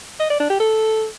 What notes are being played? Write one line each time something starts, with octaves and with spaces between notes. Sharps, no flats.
D#5
D5
D4
G4
A4